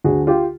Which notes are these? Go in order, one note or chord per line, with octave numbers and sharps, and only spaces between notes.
D2 D3 F#4 G#4
F4 G4